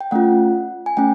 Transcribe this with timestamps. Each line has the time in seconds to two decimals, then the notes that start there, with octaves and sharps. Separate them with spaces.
0.01 G5
0.11 A3 C#4 F4 F#5
0.86 G#5
0.97 A3 C#4 G5